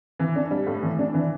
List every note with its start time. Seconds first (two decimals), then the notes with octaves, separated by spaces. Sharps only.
0.19 E3
0.36 D4
0.51 G3
0.67 A2
0.82 E3
0.99 D4
1.14 E3